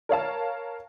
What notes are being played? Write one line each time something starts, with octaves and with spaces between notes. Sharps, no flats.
A#4 C#5 F5 A5